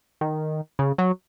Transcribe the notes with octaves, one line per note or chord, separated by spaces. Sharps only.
D#3
C#3
F#3